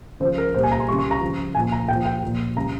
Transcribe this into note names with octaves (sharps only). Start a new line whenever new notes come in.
C#3 F3 C5
A#4
A#2 G3 C5
G#5
A#5
C6
C#3 G3 C#6
C#6
A#5
C#3 F3
A#2 F3 G#5
A#5
A#2 F3 G5
G5
A#2 F3
C#3 G3 A#5